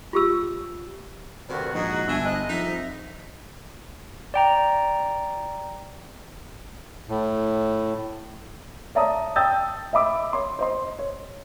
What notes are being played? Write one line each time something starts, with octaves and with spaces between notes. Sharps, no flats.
F4 G4 E6
D2 G2 C3 D#3 F#4
A#1 G#2 D#4 G#4
G1 D4 E5 G#5
C2 G#2 D#5 F#6
F2 D#4 E5
D5 G5 A#5
A2
C#5 D5 E5 A5 A#5 D#6
G5 A5 D#6 E6 G6 A6
D#5 E5 B5 D6 E6
C#5 C6
C5 D#5 C6
C#5